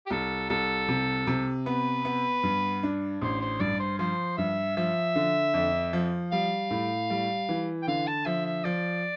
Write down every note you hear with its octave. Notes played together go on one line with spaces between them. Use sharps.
G4
C2 A4
C2 A4
C3
C3
B3 B4
B3
G2
D4
A1 C5
C5
G2 D5
C5
F3 C5
G2 E5
F3 E5
D3
F2
F3
G3 F5
A2
G3
E3
G5
D3 F5
A5
F3 E5
E5
F3 D5